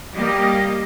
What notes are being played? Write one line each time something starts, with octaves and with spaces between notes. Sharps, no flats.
G3 A#3 G4 D#5